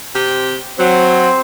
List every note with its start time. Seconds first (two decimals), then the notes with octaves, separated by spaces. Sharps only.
0.15 C3 C4 G4
0.79 F#3 C4 C5